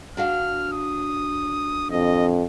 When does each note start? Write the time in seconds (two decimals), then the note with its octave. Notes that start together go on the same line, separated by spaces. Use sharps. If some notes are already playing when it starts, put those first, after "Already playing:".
0.17 D4 F#4 F5 F6
0.72 D#6
1.91 F2 D#5